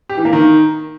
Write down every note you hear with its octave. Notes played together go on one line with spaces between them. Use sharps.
G4
E3
A#3
D#3